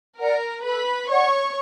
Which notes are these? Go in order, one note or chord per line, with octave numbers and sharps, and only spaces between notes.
A#4 D5 F#5 A#5
A4 B4 B5
C#5 D5 F#5 C#6